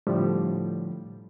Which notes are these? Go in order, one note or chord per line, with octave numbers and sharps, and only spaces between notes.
A2 D3 F3 G3